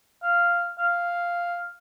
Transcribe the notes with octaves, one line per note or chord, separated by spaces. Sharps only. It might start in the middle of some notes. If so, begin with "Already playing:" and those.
F5
F5